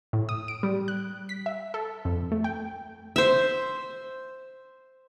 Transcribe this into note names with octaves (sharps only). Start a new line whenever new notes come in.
A2
D#6
D7
G3
F#6
B6
E5
A4
F2
A3
G5
C5 E5